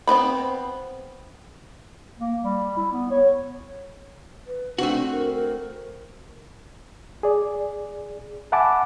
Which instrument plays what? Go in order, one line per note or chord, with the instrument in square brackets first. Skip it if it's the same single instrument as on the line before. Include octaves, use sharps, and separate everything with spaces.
[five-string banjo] B3 C4 B4 B5
[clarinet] A#3
G3
E4
B3
C#5
[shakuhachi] B4
[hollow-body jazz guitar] A3 C4 F#4 [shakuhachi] D4
[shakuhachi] A#4
A#4
[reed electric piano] G#4 D5
E5 F#5 G#5 A5 B5 D6